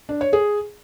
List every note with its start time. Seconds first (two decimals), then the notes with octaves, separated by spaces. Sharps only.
0.09 D4
0.21 C#5
0.33 G#4